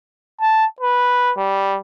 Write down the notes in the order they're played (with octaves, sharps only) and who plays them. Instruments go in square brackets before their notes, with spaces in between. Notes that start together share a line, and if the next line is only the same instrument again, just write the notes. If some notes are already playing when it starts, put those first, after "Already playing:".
[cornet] A5
B4
G3